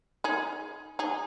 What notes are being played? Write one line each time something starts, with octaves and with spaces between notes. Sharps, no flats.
D#4 G#4
D#4 G#4